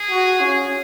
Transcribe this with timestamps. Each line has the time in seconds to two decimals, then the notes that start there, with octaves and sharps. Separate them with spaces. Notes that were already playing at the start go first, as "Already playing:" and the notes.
Already playing: G#4
0.11 F#4
0.40 C#4